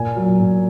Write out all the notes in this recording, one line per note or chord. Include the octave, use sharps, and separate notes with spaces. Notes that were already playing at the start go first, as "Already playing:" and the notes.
Already playing: A#2 G#5
F#3
A#2